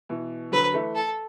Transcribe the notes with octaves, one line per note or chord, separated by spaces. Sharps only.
B2 E3
D3 F#3 B4
E3 A3
A4